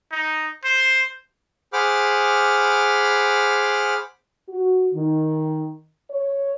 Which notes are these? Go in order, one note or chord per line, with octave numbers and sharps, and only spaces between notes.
D#4
C5
G#4 C5 F#5 B5 D6 F6
F#4
D#3
C#5